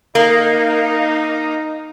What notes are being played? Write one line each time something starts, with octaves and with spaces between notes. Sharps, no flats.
A#3 D#4